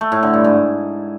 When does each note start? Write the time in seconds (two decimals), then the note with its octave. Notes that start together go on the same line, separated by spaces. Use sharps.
0.01 A3
0.12 A2
0.23 D3
0.33 G2
0.44 G#2